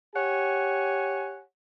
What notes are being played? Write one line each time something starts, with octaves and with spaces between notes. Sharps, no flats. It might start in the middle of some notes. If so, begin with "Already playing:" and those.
G4 C#5 F#5 G#5